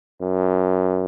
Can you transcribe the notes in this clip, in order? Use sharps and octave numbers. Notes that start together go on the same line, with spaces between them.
F#2